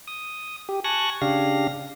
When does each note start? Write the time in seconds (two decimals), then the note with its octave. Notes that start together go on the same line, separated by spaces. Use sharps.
0.08 D#6
0.69 G4
0.84 G#5 A5 C#6 F#6 A#6
1.21 C#3 D4 G4 F5 A#6